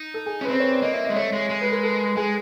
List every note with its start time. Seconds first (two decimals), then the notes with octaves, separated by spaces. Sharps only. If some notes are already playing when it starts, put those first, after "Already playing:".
Already playing: D#4
0.14 A4
0.26 G#4
0.41 C#4
0.45 B4
0.48 C4 C5
0.60 C#5
0.71 D5
0.82 A#3 D#5
0.94 E5
1.05 D#5
1.10 G#3
1.16 A3 C#5
1.33 G#3
1.49 G#3
1.61 B4
1.72 A#4
1.83 A4
2.17 G#3 G#4